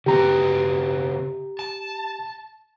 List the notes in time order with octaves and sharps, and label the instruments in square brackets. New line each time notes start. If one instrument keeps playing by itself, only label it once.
[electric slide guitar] C#3 C4 B4 [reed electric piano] G4 A#5
[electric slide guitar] A5